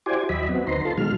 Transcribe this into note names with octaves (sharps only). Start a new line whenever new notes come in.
E4 F#4 G4 C5 D5 G#5
D#2 F#3 D#5 E5 B5
B3 C4 F#4
D2 D#4 B4 C5 A#5 C6
F4 A4 A5 C6
B2 D#3 F#3 G#3 F6